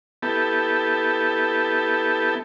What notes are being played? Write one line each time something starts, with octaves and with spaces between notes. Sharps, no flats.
B3 E4 G4 A4